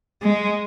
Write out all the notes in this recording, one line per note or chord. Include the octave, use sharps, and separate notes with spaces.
G#3